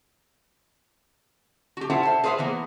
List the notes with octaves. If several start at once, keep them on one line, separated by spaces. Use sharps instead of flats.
F#4 G4
E4 F4 A4 C5 E5 F#5
C5 E5
G#4 B4 C5 E5 F5
E3 A#3 B3